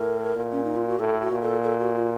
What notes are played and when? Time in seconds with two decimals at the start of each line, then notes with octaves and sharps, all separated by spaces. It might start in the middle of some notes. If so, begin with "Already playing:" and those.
Already playing: A2 A#4
0.36 A#2
0.52 C#4
0.64 D#4
0.76 F4
0.87 F#4
0.99 A2 A4
1.21 F#4
1.32 A#2
1.42 A4
1.63 A4
1.79 F#4
1.95 F4